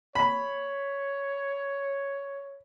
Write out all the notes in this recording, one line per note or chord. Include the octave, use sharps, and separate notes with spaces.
C#5 B5